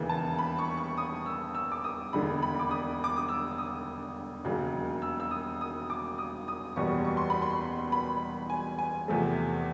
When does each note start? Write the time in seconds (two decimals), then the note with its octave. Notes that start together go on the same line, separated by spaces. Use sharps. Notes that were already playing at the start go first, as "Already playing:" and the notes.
Already playing: E1 D#2 C#3 E3
0.09 A5
0.38 B5
0.58 C#6
0.77 C#6
0.97 D#6
1.26 E6
1.55 E6
1.72 D6
1.84 D#6
2.13 E1 D#2 D3 B5
2.42 B5
2.59 D6
2.71 D#6
3.04 D6
3.16 D#6
3.29 E6
3.58 D#6
4.44 E1 D#2 C#3 F#3
5.02 E6
5.20 E6
5.31 D#6
5.61 D#6
5.90 D6
6.18 D#6
6.48 D#6
6.76 F#1 E2 B2 G3 C#6
7.05 C#6
7.17 C6
7.30 B5
7.42 C6
7.92 B5
8.50 G#5
8.78 G#5
9.08 E2 C3 F3 A3